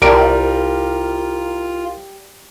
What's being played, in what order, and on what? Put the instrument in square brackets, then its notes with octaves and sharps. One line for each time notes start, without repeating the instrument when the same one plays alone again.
[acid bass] C2 [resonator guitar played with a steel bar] G3 [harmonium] F4 [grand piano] A#4 D7